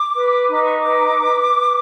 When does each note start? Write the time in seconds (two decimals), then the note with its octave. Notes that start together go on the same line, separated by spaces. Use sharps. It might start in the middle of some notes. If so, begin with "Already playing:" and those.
Already playing: D6
0.15 B4
0.49 D#4 D6
0.64 C#6
0.78 D6
0.85 B4
1.20 B4
1.55 B4